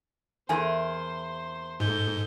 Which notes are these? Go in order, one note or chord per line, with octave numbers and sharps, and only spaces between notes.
E2 G#4 A#4 C5 G#5
G#2 A4 G6